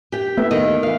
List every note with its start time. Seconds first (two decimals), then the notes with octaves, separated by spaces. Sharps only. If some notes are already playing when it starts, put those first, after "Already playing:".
0.12 G4 G5
0.37 A3 B3 E5
0.51 D#2 D#3 D#5
0.83 E3 F5